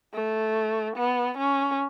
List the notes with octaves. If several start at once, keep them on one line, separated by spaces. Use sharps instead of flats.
A3
B3
C#4